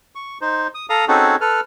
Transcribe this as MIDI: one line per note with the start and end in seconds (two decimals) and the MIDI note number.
0.15 0.38 85
0.41 0.67 63
0.41 0.67 72
0.75 0.86 87
0.90 1.05 69
0.90 1.05 77
0.90 1.05 82
0.90 1.05 87
1.08 1.36 60
1.08 1.36 61
1.08 1.36 63
1.08 1.36 66
1.08 1.36 68
1.08 1.36 69
1.41 1.60 69
1.41 1.60 71
1.41 1.60 89